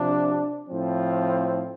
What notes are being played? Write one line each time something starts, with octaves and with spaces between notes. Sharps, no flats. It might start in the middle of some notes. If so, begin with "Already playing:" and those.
Already playing: C3 F3 D4
A2 F3 C4